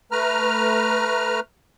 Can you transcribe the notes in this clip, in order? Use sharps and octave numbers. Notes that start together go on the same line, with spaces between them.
A3 B4 A#5 F6